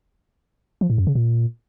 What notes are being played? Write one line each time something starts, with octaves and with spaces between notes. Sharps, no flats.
F3
A2
F#2
C#3
A#2